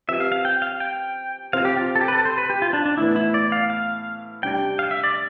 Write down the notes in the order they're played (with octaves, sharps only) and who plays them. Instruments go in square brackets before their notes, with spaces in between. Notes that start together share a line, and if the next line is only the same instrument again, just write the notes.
[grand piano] F3 C4 G4 B4 [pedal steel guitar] E5
[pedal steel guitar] F5
F5
G5
F5
G5
[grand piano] C3 F3 C4 [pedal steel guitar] F5
[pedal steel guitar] G4
F4
A4
G4
B4
A4
C5
B4
G4
F4
D4
D4
[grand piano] A2 E3 B3 [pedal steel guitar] E4
[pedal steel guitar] E4
D5
F5
F5
[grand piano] C3 G3 D4 [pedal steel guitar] G5
[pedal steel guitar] F5
E5
D5